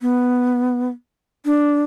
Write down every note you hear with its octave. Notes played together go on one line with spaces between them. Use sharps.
B3
D4